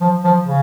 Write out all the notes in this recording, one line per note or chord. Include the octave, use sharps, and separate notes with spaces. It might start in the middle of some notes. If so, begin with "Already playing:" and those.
F3
F3
C#3